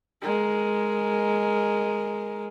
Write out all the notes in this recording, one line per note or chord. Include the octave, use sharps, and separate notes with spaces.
G#3 A#4